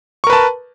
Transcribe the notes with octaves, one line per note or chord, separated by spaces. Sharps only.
A#4 B4 A5 C#6